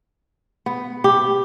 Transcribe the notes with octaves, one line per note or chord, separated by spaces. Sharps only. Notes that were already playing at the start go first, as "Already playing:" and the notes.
B3
G4